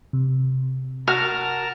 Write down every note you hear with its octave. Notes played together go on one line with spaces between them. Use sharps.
C3
F#4 A#4 A5 A#5 F6